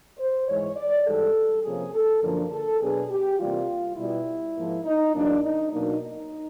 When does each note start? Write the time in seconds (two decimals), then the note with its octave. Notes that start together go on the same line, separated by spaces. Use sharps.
0.18 C5
0.47 G#2 E3 G#3 C#5
0.76 D5
1.06 G#2 E3 G3 A4
1.64 C3 F3 A#3 C#4 G#4
1.94 A4
2.22 F#2 D3 F3 A#3 D4 A#4
2.51 A4
2.80 B2 F#3 B3 D4 G#4
3.10 G4
3.39 C3 E3 G3 A#3 F4
3.97 B2 G3 B3 E4
4.56 G#2 F3 A#3
4.85 D#4
5.14 E2 C#3 F#3 A#3 D4
5.43 D#4
5.72 B2 F#3 A#3 D4 D#4
6.01 D#4